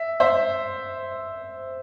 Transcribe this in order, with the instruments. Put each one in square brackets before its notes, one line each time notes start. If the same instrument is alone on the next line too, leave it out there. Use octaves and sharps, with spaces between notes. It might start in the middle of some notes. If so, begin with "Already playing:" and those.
Already playing: [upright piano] E5
C5 E5